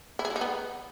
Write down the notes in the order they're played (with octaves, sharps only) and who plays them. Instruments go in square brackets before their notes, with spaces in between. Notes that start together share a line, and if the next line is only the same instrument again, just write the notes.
[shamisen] E4
G#4
E4
D#4
B3